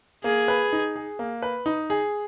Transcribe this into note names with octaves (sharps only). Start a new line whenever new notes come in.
A#3 G#4
B4
D#4
G#4
A#3
B4
D#4
G#4